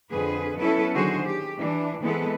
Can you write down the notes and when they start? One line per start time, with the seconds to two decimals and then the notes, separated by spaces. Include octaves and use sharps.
0.12 F2 D3 G#4 B4
0.60 F#3 B3 C#4 E4 A4 B4
0.95 D3 D#3 F#3 F#4 G#4 C5
1.25 G4
1.58 E3 D4
2.02 E3 G#3 B3 C4 A4 B4